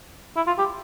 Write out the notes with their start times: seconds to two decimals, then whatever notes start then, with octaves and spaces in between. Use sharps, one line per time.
0.37 E4
0.47 F4
0.59 G4